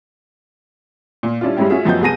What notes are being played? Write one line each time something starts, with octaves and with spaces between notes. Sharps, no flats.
A#2
G3 C#4 D4 E4 F4
G2 G3 G#3 C#4 E4 G4
C#4 F4 F#4 G#4 E5
F#2 F3 B3 G4 D#5 G6
C2 B3 G#4 A5 A#6 D#7